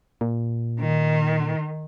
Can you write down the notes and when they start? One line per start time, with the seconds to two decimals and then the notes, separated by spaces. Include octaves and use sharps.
0.21 A#2
0.80 D#3